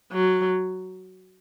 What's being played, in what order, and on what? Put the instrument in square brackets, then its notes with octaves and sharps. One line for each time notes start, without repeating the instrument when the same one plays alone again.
[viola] F#3